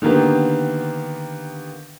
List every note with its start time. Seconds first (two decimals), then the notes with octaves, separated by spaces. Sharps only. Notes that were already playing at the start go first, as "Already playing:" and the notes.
0.02 D3 D#3 A#3 B3 G4